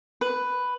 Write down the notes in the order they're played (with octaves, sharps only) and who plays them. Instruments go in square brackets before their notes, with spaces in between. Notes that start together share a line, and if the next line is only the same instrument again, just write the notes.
[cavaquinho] B4